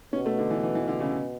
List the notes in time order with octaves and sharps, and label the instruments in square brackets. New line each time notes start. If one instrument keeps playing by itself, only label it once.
[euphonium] B2 [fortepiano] C#4
[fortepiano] A3
D3
E3
E3
E3
D3
C#3